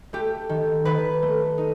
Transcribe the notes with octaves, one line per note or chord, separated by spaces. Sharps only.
A3 G4
D#3
D#3 B4
A3
D#4